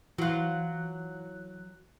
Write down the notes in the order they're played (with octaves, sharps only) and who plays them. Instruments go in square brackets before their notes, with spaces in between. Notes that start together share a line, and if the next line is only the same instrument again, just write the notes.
[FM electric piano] E3 F#6 [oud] F#3 F4